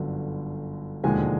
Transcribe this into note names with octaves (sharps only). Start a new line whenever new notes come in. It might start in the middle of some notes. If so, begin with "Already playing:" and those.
Already playing: G1 F#2 D3
E1 D#2 D3 F3 G#3 G#5